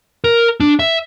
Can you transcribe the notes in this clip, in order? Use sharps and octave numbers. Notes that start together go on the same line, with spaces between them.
A#4
D4
E5